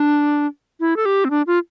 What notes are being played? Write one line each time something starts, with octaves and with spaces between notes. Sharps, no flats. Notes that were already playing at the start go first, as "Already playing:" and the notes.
Already playing: D4
E4
A4
G4
C4
D4
F4